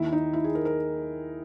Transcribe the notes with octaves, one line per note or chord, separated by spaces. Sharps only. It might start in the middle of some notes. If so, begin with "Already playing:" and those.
Already playing: D#2 D#3 E4
D#4
E4
G#4
A#4
A#4